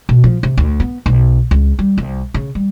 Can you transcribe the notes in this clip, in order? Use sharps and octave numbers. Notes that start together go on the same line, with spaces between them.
B2
F3
C3
D2
B3
B1
C#2
G3
C2
C#3
G3